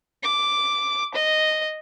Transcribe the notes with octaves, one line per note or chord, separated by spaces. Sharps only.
D6
D#5